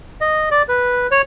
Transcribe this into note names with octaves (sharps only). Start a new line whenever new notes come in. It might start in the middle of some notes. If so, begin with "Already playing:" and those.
D#5
D5
B4
C#5